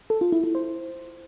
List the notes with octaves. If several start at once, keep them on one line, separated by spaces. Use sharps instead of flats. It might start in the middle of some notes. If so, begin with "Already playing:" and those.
A4
F4
E4
E4
C5